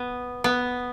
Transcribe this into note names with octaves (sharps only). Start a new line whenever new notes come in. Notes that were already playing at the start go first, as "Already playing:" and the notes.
Already playing: B3
B3